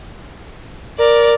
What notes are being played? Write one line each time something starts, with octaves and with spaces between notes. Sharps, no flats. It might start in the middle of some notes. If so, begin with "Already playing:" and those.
A#4 D5